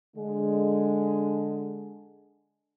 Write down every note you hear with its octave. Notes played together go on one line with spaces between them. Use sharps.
D3 G#3